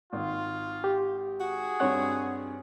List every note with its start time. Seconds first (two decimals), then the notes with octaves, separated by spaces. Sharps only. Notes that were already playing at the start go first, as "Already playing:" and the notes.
0.13 G#1 F4
0.84 G4
1.40 F#4 G#4
1.80 G2 C4 C#5 F#5